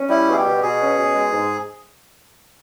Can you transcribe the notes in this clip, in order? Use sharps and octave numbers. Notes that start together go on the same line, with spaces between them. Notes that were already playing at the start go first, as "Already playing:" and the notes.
Already playing: C#4
G3 E4
B2 G#4
G4
B2
B2 G#4
C#4
B2
G#3
G#2